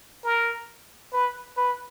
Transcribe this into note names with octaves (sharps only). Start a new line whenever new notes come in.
A#4
B4
B4